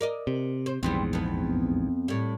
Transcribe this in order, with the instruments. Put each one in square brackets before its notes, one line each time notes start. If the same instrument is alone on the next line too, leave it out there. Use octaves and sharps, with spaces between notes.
[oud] A#4 D5 D#5
[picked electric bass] C3
[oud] C5
[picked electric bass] A#1 E2 G#2 [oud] G3 B3 C4
[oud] F2 B3
A2 G3